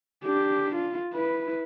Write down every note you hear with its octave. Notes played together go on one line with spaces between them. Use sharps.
D4 G4
F4
E4 B4